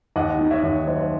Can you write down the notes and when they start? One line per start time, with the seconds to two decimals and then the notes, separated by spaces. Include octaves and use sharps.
0.16 D#2 D#5 F#5
0.39 D#3
0.51 C#5 E5
0.64 D#2
0.87 F#3 C5 D#5
1.00 C5